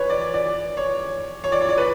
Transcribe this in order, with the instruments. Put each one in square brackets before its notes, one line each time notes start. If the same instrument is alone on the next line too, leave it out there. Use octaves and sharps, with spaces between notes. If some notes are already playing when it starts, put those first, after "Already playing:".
Already playing: [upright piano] B4 C#5
D5
D5
C#5
C#5
D5
C#5
D5
B4